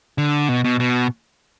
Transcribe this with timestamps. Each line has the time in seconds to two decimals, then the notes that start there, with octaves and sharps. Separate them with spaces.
0.18 D3
0.49 B2
0.64 B2
0.80 B2